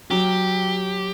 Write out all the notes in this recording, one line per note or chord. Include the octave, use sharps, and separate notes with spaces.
F#3 G4